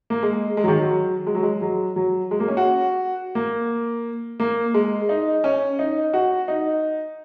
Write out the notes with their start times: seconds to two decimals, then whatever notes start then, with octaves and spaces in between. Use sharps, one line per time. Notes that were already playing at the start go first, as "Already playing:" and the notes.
0.10 A#3
0.23 G#3
0.57 G#3
0.64 F#3
0.68 D#3
0.80 F#3
1.27 G#3
1.35 F#3
1.43 G#3
1.62 F#3
1.96 F#3
2.31 G#3
2.40 A#3
2.48 C#4
2.57 F#4
3.35 A#3
4.40 A#3
4.74 G#3
5.09 D#4
5.44 C#4
5.79 D#4
6.14 F#4
6.48 D#4